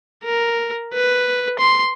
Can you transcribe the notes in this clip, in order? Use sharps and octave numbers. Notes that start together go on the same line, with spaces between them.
A#4
B4
C6